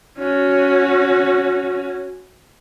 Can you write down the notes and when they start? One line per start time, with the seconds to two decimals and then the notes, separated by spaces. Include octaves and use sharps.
0.18 C#4 F#4